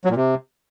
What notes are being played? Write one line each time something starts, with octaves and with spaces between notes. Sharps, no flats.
F#3
A#2
C3